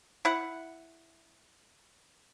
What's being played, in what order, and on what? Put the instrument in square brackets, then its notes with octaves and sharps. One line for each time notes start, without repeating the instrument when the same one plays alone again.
[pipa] E4 F#5